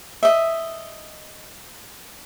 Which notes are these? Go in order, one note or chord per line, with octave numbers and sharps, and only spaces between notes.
D#5 E5